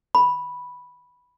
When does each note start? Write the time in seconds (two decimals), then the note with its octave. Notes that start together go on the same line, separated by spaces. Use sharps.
0.15 B5